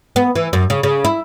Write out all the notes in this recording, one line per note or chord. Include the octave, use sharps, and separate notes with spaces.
B3
E3
F#2
C#3
C#3
E4